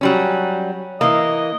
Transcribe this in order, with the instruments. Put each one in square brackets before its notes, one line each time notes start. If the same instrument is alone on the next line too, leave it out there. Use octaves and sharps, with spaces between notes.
[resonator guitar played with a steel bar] F#3 G3 C#4
[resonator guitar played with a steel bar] E3 A#3 [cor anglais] D#5